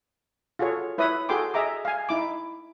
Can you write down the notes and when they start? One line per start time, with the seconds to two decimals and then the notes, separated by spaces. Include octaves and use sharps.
0.59 F4 F#4 G#4 A4 C#5
0.98 E4 B4 C#5 E5 D#6
1.29 F#4 G#4 A4 G5 C6 D6
1.54 G#4 D#5 E5 A#5 D6
1.85 F5 G#5
2.09 D#4 E4 D6